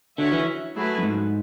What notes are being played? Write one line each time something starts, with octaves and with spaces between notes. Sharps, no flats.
D3 C#4 F#4 C#5 E5
E3
F#3 A3 E4 G#4 B4
F#2
G#2